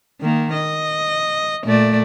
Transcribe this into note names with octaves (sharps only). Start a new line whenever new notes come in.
D#3 A#3
D#5
A#2 A3 D5